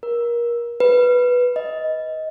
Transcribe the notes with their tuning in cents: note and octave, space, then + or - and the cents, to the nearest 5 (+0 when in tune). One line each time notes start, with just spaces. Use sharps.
A#4 +25
B4 -5
D#5 +15